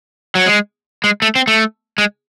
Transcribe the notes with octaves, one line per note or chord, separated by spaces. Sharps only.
F#3
G#3
G#3
A3
C4
A3
G#3